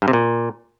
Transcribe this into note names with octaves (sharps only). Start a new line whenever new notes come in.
G2
C3
A#2